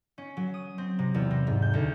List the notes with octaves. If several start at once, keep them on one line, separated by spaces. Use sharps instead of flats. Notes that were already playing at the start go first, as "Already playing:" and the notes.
C#4
F#3
D#6
C4
C3
E2
C3
G#2
G6
D2